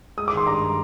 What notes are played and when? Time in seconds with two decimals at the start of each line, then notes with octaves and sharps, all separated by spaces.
0.17 G#3 D#6
0.28 D6
0.32 D#3 C6
0.47 G2 A#5